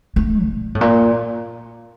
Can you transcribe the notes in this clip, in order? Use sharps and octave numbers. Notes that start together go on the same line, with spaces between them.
A3
A#2
A2
A#2